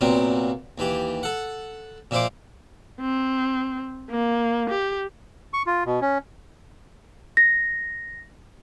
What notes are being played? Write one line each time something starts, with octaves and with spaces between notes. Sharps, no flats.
C2 A#2 F#3 B3 C4
D#2 E3 G4
A4 F#5
A#2 F3 E4 C5 D6
C4
A#3
G4
C#6
F4
B2
C#4
A#6